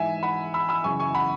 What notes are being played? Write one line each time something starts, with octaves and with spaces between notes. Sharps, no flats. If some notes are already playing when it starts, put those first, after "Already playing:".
Already playing: G#2 E3 E5 G#5
F#5 B5
B5 E6
B5 E6
F#2 C#3 E3 G#5 C#6
G#5 C#6
F#5 B5